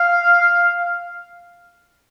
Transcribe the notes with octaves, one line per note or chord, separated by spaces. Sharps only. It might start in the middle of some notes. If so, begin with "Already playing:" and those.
Already playing: F5